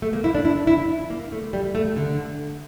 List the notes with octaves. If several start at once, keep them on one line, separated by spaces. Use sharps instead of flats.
A3
A#3
E4
D4
E4
E4
A#3
A3
G3
A3
D3